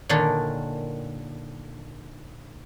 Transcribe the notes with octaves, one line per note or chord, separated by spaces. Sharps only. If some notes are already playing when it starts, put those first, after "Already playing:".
A#2 D3 D#3 C#4 D4